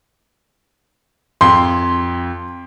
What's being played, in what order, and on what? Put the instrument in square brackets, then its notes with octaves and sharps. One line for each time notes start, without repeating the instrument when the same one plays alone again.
[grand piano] F2 [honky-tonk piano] C6